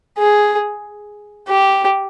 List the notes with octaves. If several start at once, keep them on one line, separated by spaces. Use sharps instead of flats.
G#4
G4